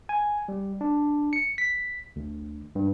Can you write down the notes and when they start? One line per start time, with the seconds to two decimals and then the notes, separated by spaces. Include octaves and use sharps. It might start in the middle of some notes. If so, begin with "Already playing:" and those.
0.09 G#5
0.48 G3
0.81 D4
1.33 C#7
1.58 B6
2.16 D2
2.75 G2